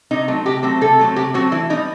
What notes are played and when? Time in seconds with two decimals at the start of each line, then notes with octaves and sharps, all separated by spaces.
0.11 C3 D#4
0.28 F#3 A3 C4
0.46 C3 G4
0.63 F#3 A3 C4
0.81 C3 A4
0.99 F#3 A3 C4
1.16 C3 G4
1.34 F#3 A3 C4 F#4
1.52 E3 E4
1.70 G3 B3 D#4